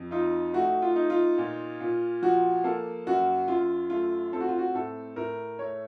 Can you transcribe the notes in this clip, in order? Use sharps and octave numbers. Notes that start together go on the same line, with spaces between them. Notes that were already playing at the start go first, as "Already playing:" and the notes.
Already playing: F2
D#4 F4
A3 F#4
F4
D#4
F4
A#2
A#2
F3 F#4
A#3 A4
F#2 F#4
F#2 F4
A3 F4
C4 A4
F#4
F4
F#4
A2 A4
A2 A#4
A3 C#5